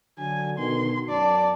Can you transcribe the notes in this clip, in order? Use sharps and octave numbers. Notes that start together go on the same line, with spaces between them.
D3 F#3 G#5
B2 D3 D#3 C6
F#2 D5 A5